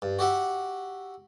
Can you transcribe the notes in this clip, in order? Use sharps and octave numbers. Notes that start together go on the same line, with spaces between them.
G2
F#4 G4 E5 F#5